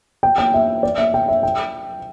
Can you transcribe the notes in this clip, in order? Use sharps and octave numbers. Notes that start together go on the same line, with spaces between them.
G5
G5
E5
D5
E5
G5
E5
G5